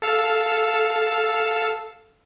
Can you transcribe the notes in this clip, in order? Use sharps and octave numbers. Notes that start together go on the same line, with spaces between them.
A4 F5 E6